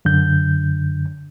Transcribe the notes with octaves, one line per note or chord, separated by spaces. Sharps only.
F#2 D3 G6